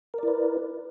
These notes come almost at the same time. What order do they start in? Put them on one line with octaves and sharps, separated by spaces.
A#4 D5 E4 B4